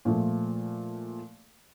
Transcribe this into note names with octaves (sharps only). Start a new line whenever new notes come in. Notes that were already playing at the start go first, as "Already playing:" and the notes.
A#2 F3 A3